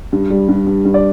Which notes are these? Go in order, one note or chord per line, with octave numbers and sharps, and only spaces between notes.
G2
G3
G2
G2
G2
D5